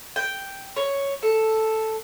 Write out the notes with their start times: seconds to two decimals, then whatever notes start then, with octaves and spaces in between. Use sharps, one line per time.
0.16 G5
0.76 C#5
1.23 A4